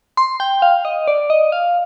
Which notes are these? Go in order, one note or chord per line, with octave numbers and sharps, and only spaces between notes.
C6
G5
F5
D#5
D5
D#5
F5